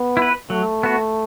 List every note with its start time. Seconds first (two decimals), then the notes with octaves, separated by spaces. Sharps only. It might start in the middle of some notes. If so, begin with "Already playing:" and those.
Already playing: B3
0.17 E4
0.22 B4
0.50 F#3 A3
0.83 B3 F#4